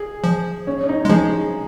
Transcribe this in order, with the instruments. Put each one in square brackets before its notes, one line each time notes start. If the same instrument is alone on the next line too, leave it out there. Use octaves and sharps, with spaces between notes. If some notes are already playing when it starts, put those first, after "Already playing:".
Already playing: [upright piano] G#4
[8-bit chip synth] F3
[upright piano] C#4
C#4
D#4
[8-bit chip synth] G#3
[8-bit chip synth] F3 [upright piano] G#4